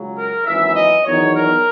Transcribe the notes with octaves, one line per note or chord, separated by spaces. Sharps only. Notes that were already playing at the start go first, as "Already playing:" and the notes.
Already playing: C#2 C#3 F#3
A#4
G#1 F#2 E3 E5
D#5
E2 D#3 F#3 C#5
A#4